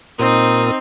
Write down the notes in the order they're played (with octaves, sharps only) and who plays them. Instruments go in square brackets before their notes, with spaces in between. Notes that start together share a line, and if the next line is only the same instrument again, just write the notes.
[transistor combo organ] A#2 A#4 D#6 [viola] C4 D#4